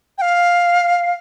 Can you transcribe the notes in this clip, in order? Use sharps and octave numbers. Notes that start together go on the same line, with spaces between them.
G5
F5